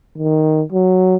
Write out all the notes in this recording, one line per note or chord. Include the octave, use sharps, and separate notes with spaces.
D#3
F#3